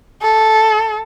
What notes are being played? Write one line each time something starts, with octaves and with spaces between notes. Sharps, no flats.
A4